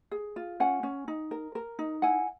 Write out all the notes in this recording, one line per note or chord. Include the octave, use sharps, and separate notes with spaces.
G#4
F4
C#4 F#5 G#5
C#4
D#4
A#4
A#4
D#4
E4 F#5 G#5